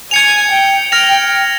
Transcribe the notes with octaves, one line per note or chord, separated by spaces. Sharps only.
G#5 G#6 C#7 F7
G5
G5 F6 A#6 F7